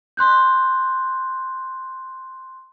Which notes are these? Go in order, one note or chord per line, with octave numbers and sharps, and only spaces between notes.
C6 F#6 G6